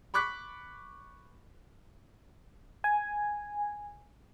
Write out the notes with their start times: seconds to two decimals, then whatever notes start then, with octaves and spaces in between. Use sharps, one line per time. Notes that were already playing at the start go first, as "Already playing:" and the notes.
0.14 B5 C#6 D6 F#6 B6
2.84 G#5